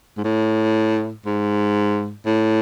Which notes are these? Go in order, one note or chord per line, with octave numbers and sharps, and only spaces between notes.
G#2
A2
G#2
A2